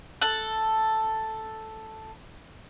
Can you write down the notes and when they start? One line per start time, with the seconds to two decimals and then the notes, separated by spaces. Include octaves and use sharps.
0.22 A4 F#6